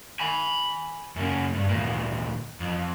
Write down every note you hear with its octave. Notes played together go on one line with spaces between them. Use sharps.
G#5 B5
F#2 C#3
G2
D2 A#2
F2